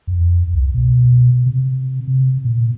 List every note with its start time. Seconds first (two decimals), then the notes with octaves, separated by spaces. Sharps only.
0.07 F2
0.53 C2
0.74 B2
1.46 C3
2.07 C3
2.44 A#2